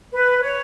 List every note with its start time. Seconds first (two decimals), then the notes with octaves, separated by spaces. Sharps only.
0.11 B4
0.42 C#5